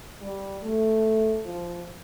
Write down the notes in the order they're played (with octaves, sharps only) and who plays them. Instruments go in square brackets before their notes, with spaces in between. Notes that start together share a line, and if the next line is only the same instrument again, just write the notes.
[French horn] G3
A3
F3